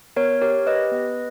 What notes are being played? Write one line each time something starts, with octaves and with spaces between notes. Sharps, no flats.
B3 A#4 C#5
G4 A#4 C#5
G4 B4 D#5
B3